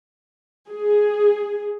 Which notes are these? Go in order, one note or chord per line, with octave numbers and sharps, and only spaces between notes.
G#4